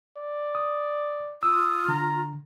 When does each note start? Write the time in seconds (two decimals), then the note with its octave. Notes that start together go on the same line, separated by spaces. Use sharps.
0.17 D5
0.55 D#6
1.43 F4 D#6 E6
1.88 D3 A#5